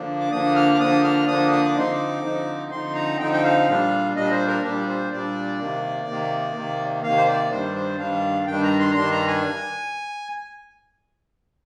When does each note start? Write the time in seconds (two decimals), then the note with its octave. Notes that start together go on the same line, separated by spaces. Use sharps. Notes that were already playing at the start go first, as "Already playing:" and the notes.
Already playing: D3 F3 A#3 D4
0.20 D6
0.32 D3 F3 A#3 D4 D#6
0.56 F6
0.74 D6
0.80 D3 F3 A#3 D4 D#6
1.04 F6
1.27 D3 F3 A#3 D4 D#6
1.51 D#6
1.65 D6
1.75 D3 F3 C4 D#4 C6
1.92 D6
2.23 D3 F3 C4 D#4
2.71 D3 F3 C4 D#4 C6
2.95 A#5
3.19 D3 F3 C4 D#4 G5
3.33 G5
3.44 F5
3.67 A#2 G3 D4
4.16 A#2 G3 D4 D#5
4.31 C5
4.47 A#4
4.63 A#2 G3 D4 G4
4.87 C5
5.11 A#2 G3 D4 D5
5.59 C3 D#3 A#3
6.08 C3 D#3 A#3
6.55 C3 D#3 A#3
7.03 C3 D#3 A#3 F5
7.17 C5
7.27 D5
7.51 G2 D#3 G3 D4 C5
7.75 C5
7.99 G2 D#3 G3 D4 F5
8.47 G2 D#3 G3 D4 G5
8.63 A#5
8.79 C6
8.91 A#5
8.95 G2 D#3 G3 D4 C6
9.11 A#5
9.27 G#5